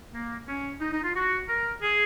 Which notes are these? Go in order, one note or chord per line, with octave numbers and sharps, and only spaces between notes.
A#3
C#4
D#4
D#4
F4
F#4
A#4
G#4